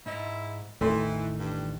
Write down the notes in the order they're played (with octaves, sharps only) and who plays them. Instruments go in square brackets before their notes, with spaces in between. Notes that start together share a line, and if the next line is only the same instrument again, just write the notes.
[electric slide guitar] G#2 D#5 [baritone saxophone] E4
[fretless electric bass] A1 E2 A2 [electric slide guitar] D#3 [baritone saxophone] E3 [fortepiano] A3 C6
[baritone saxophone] G2